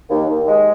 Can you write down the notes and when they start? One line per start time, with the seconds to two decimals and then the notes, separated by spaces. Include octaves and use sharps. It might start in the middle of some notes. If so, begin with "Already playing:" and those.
0.09 D#2
0.29 D#2
0.48 G#3